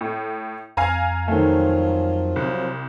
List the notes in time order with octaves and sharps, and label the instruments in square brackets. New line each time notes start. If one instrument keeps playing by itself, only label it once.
[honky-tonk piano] A2
[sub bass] F2 [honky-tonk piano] F5 G#5 A#5
[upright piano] D#3 A3 [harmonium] F3 F#3 F4
[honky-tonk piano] C2